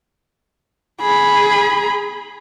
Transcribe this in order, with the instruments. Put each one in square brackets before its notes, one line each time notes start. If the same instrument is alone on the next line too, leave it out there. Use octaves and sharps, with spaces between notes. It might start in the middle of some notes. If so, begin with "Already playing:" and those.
[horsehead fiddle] G#4 B5